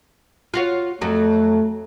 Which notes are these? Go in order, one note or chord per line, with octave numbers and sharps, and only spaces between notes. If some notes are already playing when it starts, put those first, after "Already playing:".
F4 F#4 C#5
F2 F#3 A3